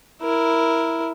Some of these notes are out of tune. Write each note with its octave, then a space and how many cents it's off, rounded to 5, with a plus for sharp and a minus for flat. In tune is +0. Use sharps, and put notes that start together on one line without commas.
E4 +0 A#4 +0